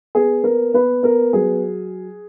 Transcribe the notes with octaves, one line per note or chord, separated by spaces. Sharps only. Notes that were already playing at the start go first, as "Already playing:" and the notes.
B3 G#4
B3 A#4
B3 B4
B3 A#4
F#3 G#4